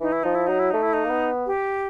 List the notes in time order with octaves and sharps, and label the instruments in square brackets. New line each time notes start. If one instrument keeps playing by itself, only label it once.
[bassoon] E3 [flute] D#4
[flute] E4
[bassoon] F3 [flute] D#4
[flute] E4
[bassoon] F#3 [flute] D#4
[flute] E4
[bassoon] A3 [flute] D#4
[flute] E4
D#4
[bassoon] A#3
B3
[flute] G4